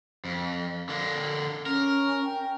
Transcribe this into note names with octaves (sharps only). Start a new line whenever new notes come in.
F2
D3 A#3
C#4 A#4
G5